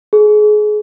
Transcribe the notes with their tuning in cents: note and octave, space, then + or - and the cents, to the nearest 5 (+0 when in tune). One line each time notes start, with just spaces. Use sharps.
G#4 +25